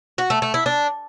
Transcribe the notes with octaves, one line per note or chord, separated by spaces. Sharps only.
F#4
A3
A3
E4
D4